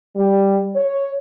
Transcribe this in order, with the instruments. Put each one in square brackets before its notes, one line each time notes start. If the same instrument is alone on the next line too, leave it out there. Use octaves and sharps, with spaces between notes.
[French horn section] G3
C#5